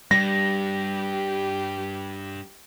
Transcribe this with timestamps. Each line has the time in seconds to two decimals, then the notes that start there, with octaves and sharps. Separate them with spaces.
0.11 G2 G3 G4 A#6